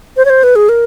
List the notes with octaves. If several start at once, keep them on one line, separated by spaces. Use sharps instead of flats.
C5
C#5
C5
B4
G#4
A#4